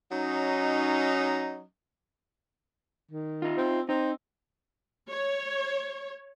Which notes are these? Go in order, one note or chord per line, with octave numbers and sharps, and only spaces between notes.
F#3 C#4 D#4
D#3
D#4 F4
C4
C4 D#4
C#5